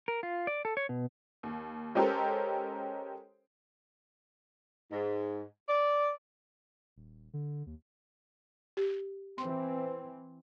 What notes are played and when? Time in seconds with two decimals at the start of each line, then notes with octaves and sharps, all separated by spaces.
0.08 A#4
0.23 F4
0.47 D5
0.65 A4
0.77 C#5
0.89 B2
1.43 D#2
1.95 G#3 C#4 G4 A4 A#4 C5
4.92 G#2
5.69 D5
6.96 D#1
7.33 D3
7.66 D#2
8.77 G4
9.38 E3 C4 C6